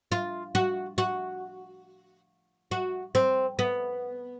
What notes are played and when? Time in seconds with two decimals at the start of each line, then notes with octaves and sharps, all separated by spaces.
0.12 F4
0.55 F#4
0.98 F#4
2.71 F#4
3.15 C4
3.59 B3